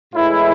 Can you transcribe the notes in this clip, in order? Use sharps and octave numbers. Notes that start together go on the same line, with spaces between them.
A2 E3 G#3 E4